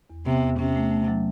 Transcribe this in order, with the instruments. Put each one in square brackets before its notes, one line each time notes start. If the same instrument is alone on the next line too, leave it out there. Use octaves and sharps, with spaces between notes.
[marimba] E2
[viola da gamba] C3 [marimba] B3
[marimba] E2
[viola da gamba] C3 [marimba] C#4
[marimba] A3
A3
F#3